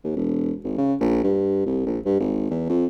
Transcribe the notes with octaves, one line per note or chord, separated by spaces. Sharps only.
D#2
E1
G#1
C#3
A#1
G2
C2
A#1
G2
G#1
E2
F2